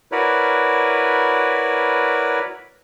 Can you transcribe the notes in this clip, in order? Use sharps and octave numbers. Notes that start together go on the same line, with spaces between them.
E4 F#4 A#4 B4 C#5 D5